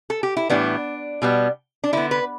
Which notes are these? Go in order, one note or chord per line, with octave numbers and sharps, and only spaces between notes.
A4
G4
E4
A2 E3 G3 B3 D4
B2 G3 B3
D4
D3 B3 E4
B4